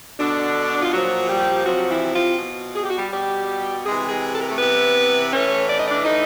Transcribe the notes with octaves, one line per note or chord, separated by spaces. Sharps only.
B2 D3 D4
F4
A#2 F3 F#3 F#4
G3 G4
C3 F3 F#3 F#4
E3 E4
F3 F4
B2
G#4
G4
F#4
G3 G4
B2 G3 G4
C3 E3 G#3 G#4
G#3 G#4
A4
A#4
A3 A4
C3 E3 B3 B4
A2 E3 C#4 C#5
D5
D#5
D4 D5
A2 E3 D#4 D#5